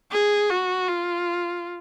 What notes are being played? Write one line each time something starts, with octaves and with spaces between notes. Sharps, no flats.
G#4
F#4
F4